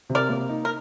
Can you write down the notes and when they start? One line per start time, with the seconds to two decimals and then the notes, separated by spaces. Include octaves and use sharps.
0.10 C3
0.15 A#4 D5
0.29 A#3
0.49 D#4
0.65 A#4